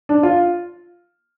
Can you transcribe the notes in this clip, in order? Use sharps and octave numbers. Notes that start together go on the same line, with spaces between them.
D4
F4